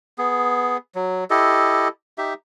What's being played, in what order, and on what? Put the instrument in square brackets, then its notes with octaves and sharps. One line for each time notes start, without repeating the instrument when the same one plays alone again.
[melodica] B3 G#4
F#3
E4 G4 A4 D#5
D#4 G4 E5